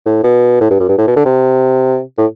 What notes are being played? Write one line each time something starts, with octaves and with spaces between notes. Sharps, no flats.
A2
B2
A2
G2
F#2
G2
A2
B2
D3
C3
A2